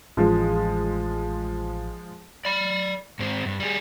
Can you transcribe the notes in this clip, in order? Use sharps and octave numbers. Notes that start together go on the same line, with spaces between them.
A1 F3 G#3
D5 B5
G#2 C4
G2
G3 G#4